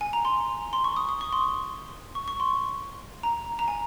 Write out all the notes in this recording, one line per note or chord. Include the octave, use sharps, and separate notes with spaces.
G#5
A#5
C6
C6
C#6
D#6
D#6
C#6
C6
C#6
C#6
C6
A#5
A#5
G#5